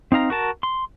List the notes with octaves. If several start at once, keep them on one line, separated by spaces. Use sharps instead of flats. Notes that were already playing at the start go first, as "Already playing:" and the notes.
C4 D#4 F5 A#5
F#4 A#4 A5
C6